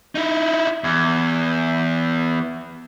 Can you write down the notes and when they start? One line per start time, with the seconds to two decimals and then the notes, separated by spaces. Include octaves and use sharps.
0.15 D#4 E4
0.84 E2